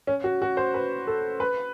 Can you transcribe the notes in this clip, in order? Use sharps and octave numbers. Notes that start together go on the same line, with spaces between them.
C#4
F#4
F#4
C5
B4
A4
B4